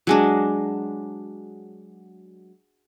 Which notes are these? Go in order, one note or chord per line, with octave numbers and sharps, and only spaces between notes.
F#3 G#3 D4